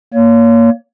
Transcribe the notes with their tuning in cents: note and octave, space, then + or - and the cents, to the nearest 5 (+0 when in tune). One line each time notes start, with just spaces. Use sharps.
A#3 +0 C#5 +25